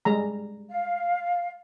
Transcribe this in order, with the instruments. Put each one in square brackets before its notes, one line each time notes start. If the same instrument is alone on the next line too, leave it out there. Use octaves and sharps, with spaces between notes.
[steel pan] G3 G#3 A#5
[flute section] F5